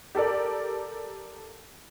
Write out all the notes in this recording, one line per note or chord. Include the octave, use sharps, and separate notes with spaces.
G4 A4 A#4 D5